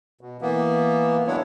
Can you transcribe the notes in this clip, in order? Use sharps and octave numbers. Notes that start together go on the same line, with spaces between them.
B2
E3 A#3 B3
F#3 G#3 B3 D4 E4 C#5